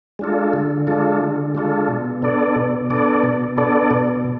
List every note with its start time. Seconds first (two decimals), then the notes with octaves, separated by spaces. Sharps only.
0.19 G#3 D4 F4 A4
0.53 D3
0.87 G#3 D4 F4 A4
1.21 D3
1.55 G#3 D4 F4 A4
1.89 B2
2.22 B3 D4 A4 D5
2.56 B2
2.90 B3 D4 A4 D5
3.23 B2
3.57 B3 D4 A4 D5
3.91 B2